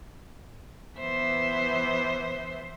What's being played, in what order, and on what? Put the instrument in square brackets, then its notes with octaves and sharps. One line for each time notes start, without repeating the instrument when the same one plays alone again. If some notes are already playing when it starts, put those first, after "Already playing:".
[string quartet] E3 B3 C5 E5